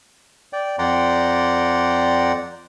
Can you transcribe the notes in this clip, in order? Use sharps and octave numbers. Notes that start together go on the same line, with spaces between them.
D5 G5
F2 D5 F#5 G5 A#5 C6